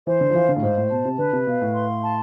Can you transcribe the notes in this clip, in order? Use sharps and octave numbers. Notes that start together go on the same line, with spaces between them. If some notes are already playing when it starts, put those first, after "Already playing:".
E3 C5
D3
F3
E3 F5
D3
A2
G#2 C5
A2
B2 A5
C3
D3 B4
C3
B2 F5
A2
C6
A5